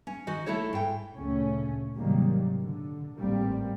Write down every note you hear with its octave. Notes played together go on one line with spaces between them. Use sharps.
C#4
D#3 F#4 D#5
D2 A3 E4 A4 C#5
G#2 G5
D2 A#2 C#3 A3 C#4
G#2 C3 D#3 F#3 G3 A#3
D3
A1 G#2 G3 A#3 C4